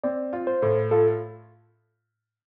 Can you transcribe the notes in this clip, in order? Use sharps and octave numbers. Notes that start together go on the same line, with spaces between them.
C4 D5
F4
C5
A2
F4 A4